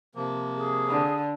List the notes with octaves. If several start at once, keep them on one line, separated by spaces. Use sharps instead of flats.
C3 F3 A#3
G#4
D3